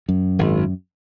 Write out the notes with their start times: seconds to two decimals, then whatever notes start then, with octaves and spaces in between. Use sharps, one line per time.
0.09 F#2
0.39 G#1